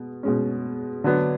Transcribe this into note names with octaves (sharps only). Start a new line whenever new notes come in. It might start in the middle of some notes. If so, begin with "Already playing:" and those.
Already playing: B2 G#3
B2 G#3 C#4
D3 F#3 B3 D4